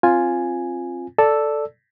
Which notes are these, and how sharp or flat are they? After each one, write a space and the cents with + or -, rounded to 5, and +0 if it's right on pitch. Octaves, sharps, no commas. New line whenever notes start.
C4 +20 F4 +0 G#5 +0
A4 +0 D5 +0 E6 +0